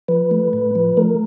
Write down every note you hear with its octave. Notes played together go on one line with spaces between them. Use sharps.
F3 B4
A3
A2
F3
A3 A#4